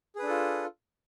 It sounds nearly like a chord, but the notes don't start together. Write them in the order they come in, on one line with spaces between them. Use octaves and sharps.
G#4 B4 D4 A4 F4